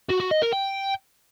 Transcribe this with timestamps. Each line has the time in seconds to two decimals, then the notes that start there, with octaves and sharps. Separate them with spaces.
0.10 F#4
0.21 F#4
0.31 D#5
0.42 A#4
0.52 G5